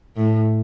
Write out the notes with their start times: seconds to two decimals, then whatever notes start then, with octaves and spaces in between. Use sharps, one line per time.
0.17 A2